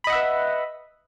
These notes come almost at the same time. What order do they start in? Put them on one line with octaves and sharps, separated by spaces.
B5 D#5 F#5 E5 B4